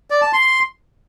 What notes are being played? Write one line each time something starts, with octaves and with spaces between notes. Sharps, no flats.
D5
A5
C6